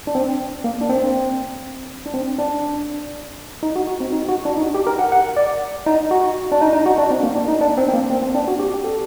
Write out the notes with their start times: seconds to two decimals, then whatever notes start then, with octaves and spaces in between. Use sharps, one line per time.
0.07 D4
0.15 C4
0.64 A#3
0.81 D4
0.90 C4
2.06 D4
2.14 C4
2.38 D4
3.63 D#4
3.76 F#4
3.87 F#4
4.00 C4
4.12 D#4
4.29 F#4
4.45 D4
4.57 D#4
4.62 F#4
4.74 G4
4.87 A#4
4.99 F#5
5.12 F#5
5.37 D5
5.86 D#4
6.11 F#4
6.52 D4
6.61 D#4
6.73 D#4
6.86 F#4
6.98 D4
7.11 C4
7.23 A#3
7.36 D4
7.48 D#4
7.61 D4
7.77 C4
7.89 C4
7.94 A#3
8.10 C4
8.22 C4
8.35 D4
8.48 F#4
8.59 G4
8.84 A4